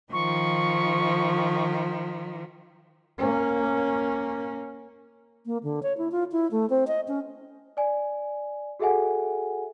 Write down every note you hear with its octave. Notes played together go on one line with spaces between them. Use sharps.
D#3 F3 C#6
A#3 C#4
A#3
D3
C#5
E4
F4
E4
A3
C4
D#5
C#4
D5 G#5
F#4 G#4 A4 E5 F#5 G#5